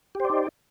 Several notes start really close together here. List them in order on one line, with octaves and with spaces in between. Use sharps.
G4 C5 D5 D#4